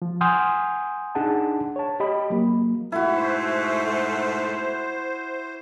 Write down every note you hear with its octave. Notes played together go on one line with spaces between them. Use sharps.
F3
F#5 G#5 C6 D#6 F6 G6
D4 D#4 G#4 F#5 A5
C#5 A5
G4 D#5 B5
F#3 A#3
G#2 B2 A3 E4 F#4
C5